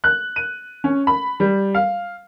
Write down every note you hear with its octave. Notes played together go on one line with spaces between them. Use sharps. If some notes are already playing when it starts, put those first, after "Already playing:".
F#6
D#7
C#4
B5
G3
F5